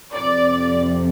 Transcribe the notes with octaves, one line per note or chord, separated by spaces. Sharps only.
F2 C3 F3 D5